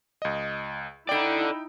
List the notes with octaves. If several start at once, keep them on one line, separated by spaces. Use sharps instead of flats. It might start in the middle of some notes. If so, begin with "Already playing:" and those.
C#2 D#5
D#4 E4 A4 D5 G5 D7